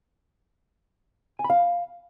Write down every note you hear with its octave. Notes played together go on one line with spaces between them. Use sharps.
G#5
B5
F5